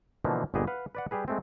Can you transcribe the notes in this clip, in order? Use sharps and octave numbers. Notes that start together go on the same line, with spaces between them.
B2 D3 E3 F3 A3 A#3
G1 A#2 B3 G4 G#4 D#5
B4 F5 F#5
B4 D5 F#5
G3 G4 G#4 B4
G#3 A3 C4